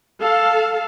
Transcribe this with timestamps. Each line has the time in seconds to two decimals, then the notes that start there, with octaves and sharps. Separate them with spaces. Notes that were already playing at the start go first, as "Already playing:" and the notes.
0.23 A4 F5